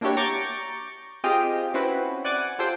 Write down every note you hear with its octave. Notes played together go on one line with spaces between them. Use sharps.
A#3 D4 E4 F#4 G4 C#5
A#5 C#6 D6 G6 A6
C4 F4 G4 G#4 D#5 G5
C4 C#4 E4 F#4 B4
D5 F#5 G#5 D6
F4 G4 A4 C5 G5